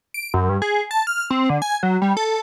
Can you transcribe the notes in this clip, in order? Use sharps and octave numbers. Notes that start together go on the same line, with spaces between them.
D7
F#2
G2
G#4
A5
F6
C4
D3
G#5
F#3
G3
A4